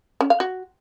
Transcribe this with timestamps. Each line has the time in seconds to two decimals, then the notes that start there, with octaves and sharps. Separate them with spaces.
0.21 C#4
0.30 F5
0.40 F#4